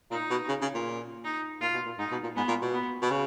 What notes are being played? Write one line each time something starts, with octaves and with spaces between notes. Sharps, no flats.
A#2 D#4
B2
C#3
C#3
A#2
D#4
A#2 F4
B2
A#2
G#2 D#4
B2
A#2
G#2 B3
A#2
B2
B3
B2
C#3